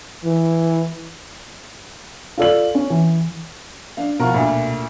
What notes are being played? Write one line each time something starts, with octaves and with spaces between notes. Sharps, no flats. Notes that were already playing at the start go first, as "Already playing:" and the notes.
E3
F4 A4 D5 F#7
C#4
E3
D4 F5
B2 F3 F4 A#4 F#5 C#6
D2 A#2